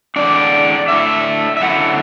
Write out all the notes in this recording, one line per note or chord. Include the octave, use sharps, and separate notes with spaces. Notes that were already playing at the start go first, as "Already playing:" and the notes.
A2 E3 D4 D5
A2 A3 D4 E5
E5
F#2 D3 A3 E4 F#5